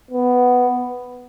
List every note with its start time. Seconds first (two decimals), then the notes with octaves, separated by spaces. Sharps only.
0.11 B3